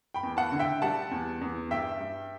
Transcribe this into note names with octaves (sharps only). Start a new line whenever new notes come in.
G5 B5
E2
F#5 A5
D3
E5 G5
G3 F#5 A5
E2
E2
G2 E5 G5
G2